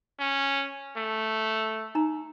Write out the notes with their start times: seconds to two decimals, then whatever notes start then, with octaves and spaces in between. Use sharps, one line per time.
0.19 C#4
0.97 A3
1.95 D#4 A#5